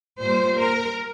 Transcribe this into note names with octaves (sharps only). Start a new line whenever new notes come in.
A#2 G3 A#3 C5
A#4